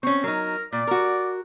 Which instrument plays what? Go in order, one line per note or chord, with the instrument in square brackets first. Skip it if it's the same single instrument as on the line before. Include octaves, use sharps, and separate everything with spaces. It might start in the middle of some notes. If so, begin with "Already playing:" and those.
[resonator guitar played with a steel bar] C4 C#4 [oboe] C#6
[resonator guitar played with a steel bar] F#3 D#4 [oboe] A#4
[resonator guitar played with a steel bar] A#2 [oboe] D5
[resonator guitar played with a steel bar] F#4 A#4